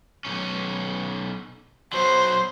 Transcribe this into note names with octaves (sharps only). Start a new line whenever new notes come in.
B1 C#4
B2 F#3 C5